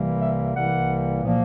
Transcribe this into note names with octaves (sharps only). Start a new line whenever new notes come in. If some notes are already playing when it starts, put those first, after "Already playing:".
Already playing: C2 C3 E3 G3 A#3
E5
C2 C3 E3 G3 A#3 F#5
A#2 F3 A#3